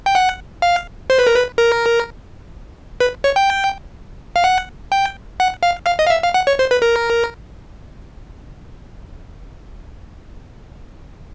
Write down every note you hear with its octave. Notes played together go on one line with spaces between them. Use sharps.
G5
F#5
F5
C5
B4
A#4
B4
A#4
B4
C#5
G5
F5
F#5
G5
F#5
F5
F5
D#5
F5
E5
F5
F#5
C#5
C5
B4
A#4